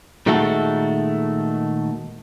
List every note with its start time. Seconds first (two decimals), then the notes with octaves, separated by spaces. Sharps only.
0.26 A#2 D#3 G#3 A3 F#4 A4